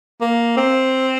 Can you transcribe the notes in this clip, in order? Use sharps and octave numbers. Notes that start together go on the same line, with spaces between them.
A#3
C4